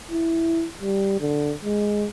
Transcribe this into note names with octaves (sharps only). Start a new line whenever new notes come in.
E4
G3
D3
G#3